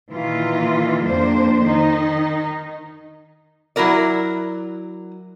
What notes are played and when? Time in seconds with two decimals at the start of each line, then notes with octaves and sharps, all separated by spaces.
0.12 A#2 D#3 E3 F4
1.05 F2 A#3 D4 C5
1.64 D#3 D#4
3.76 F#3 E4 F#4 A#4 D5